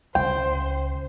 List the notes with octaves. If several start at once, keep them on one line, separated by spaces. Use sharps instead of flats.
C#2 C#3 C5 G5